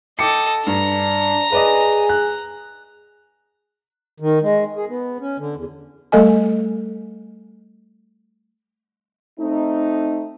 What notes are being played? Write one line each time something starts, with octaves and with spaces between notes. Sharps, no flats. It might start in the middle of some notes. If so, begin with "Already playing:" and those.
A4 D#5 G5 D6 C#7
G2 D4 A#5
G#4 B4 D5 D#5
F#6
D#3
G#3
G#4
B3
C#4
D3
E2
G3 A3 A4 D#5 G#5
A3 C4 D#4